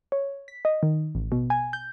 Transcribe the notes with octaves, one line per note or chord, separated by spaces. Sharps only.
C#5
B6
D#5
D#3
A1
B2
G#5
G6